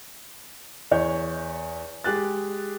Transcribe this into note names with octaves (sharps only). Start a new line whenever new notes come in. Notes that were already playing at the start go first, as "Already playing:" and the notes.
E2 C#5 G6
G#3 G4 G#4 F#6 A6